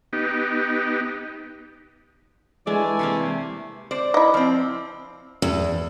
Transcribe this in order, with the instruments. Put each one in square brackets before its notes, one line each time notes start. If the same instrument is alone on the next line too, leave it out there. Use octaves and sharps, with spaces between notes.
[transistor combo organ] B3 D#4 G4
[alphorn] E3 [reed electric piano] G#3 [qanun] A3 D4 [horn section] D5 E5 G#5
[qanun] C3 A3 A#3
[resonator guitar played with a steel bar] C5 D5
[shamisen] E4 D#5
[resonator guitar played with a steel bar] F3 C4
[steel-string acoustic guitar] E2